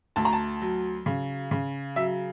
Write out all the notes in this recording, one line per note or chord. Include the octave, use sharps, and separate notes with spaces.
D2 A5
A#5
A5
F#3
C#3
C#3
F#3 E5